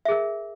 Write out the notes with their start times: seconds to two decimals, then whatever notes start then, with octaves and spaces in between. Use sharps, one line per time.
0.05 E5
0.08 G#4
0.11 A#4